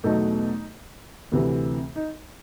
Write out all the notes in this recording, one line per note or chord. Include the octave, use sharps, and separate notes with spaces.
E2 B2 F#3 A3 D#4
D2 C3 E3
D#4